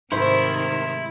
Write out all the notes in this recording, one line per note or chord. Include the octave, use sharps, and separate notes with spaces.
G#2 C3 D#3 A3 E4 A#4 C5